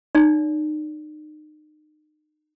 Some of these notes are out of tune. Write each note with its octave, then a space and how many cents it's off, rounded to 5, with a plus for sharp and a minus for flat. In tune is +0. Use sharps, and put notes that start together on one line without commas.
D#4 -30 D5 -40